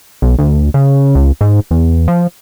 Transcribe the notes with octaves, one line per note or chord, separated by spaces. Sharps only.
B1
D2
C#3
C#2
G#2
E2
F3